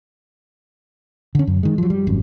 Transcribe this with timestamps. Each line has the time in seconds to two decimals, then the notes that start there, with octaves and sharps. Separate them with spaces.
1.35 D3 C#4
1.47 F#2
1.63 D#3 G#3
1.78 F3 F#3
1.90 G3
2.07 G#1 F#2